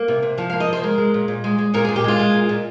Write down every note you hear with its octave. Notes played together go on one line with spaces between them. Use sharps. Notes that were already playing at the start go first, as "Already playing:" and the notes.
Already playing: A#3
C3
C3
F3 F5
F5
A#3
D#5
C3 C5
G#3 A#4
G#3
A#2
A#2
G#3
G#3
A#2 A#4
G#4
A#2
G4
G#3 F4
G#3
A#2
A#2